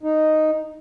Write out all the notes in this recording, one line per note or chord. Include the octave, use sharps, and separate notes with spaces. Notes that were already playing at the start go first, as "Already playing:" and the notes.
D#4